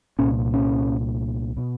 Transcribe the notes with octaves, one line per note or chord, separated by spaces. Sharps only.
C2 A#2 C#4
C#4
B2